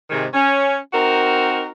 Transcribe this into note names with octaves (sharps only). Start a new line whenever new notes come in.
G#2 C3 D#3 G#3
C#4
C4 D#4 F#4 A#4